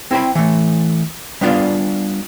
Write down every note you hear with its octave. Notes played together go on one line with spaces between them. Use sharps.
C4 E4 C5 G5 B5
E3 A3
G3 B3 D4 F4 D5 F5